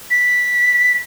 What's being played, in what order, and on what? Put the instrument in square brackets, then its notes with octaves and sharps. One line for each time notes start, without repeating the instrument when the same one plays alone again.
[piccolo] B6